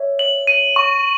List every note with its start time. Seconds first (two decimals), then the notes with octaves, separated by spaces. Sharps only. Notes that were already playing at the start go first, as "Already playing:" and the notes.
Already playing: C#5 E5
0.19 F#7
0.47 D#7
0.76 C#6